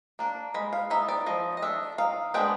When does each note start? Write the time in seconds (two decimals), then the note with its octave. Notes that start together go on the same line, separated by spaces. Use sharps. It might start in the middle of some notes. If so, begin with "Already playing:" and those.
0.19 A#3 D4
0.54 G#3 B5
0.73 F5
0.90 B3 D#4 E5
1.09 D5
1.26 F3 D#5
1.57 D#5
1.62 A3 D4 E5
1.98 D#3 F5
2.34 G#3 B3 D4 G5